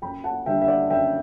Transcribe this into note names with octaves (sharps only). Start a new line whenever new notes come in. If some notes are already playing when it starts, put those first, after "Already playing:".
F#2 G5 B5
F#5 A5
D3 G3 D4 E5 G5
E5
D5 F#5
F#2 E5 G5